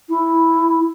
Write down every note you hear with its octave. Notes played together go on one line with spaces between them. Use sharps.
E4